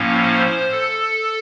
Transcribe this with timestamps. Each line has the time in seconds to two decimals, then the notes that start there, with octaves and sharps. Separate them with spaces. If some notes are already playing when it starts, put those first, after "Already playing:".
Already playing: A2 F3 A#3 C#4
0.23 C5
0.72 A4